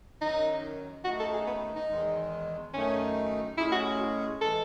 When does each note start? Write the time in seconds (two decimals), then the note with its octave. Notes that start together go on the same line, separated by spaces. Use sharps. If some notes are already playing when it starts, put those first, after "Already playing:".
0.21 F#2 D#3 F#3 D#4
1.05 F#2 D#3 A3 D#4 F#4
1.19 A4
1.33 G#4
1.47 B3
1.75 D#4
1.89 E2 D#3 G#3
2.74 F#2 D#3 A3 C#4 D#4
3.58 A2 G#3 C#4 E4 G#4
3.72 F#4
4.41 E3 G#3 A4